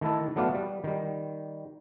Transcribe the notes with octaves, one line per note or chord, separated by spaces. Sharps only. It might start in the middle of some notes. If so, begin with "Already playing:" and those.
D#3 A3 E4 A4
F#3 A3 B3 D5 F5 F#5
G3
D#3 G3